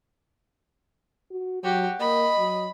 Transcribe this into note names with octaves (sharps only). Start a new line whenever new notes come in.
F#4
F#3 F#4 G4
A#3 D#5 B5
F#3